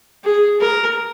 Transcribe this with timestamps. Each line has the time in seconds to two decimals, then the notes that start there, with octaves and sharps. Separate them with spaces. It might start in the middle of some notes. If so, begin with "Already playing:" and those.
0.24 G#4
0.60 A#4